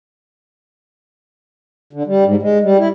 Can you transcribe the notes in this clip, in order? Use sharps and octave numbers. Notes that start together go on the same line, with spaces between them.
D3
G3
G#2
G#3
G3
E4